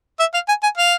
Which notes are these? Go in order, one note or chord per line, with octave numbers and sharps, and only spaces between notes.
E5
F5
G#5
G#5
F5